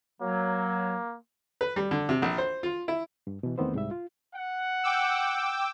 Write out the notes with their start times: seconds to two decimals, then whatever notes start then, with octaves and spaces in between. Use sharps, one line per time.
0.21 F#3 A#3
1.61 B4
1.76 G3
1.91 D3
2.09 C3
2.22 A#1
2.38 C5
2.63 F4
2.88 E4
3.27 G2
3.43 B2 E3
3.58 E2 D#3 A3 B3 C4 C5
3.74 C2 G#2 G3 E5
3.91 F4
4.35 F#5
4.83 G5 D6 E6